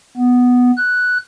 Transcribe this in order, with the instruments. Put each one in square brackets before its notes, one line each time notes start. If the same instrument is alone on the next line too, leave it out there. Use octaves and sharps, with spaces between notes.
[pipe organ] B3
F#6